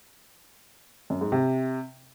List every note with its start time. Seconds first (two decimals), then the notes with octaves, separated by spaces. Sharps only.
1.10 F#2
1.21 G#2
1.32 C3